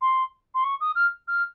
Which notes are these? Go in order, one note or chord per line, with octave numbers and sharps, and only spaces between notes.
C6
C6
C#6
D#6
F6
F6